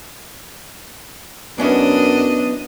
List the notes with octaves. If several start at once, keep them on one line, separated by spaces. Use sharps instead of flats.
F#2 B3 C#4 D4 E4 D#5